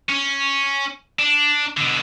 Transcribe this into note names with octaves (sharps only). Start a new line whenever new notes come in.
C#4
D4
B2 D3